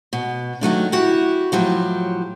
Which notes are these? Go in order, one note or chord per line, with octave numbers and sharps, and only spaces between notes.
B2
D#3 F#3 A3 D4
E4 F#4 G4
A2 F3 F#3 G4